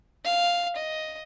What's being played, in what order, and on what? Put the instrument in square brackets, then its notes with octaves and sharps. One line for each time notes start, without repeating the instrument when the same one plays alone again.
[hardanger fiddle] F5
D#5